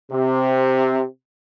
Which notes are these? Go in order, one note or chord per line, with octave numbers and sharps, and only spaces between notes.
C3